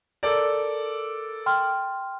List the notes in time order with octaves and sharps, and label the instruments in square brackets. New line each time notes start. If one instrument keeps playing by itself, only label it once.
[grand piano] A4 A#4 D5
[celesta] G5 C6 F6